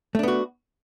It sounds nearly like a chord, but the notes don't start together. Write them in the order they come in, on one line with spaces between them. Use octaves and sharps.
A3 D4 B3 F#4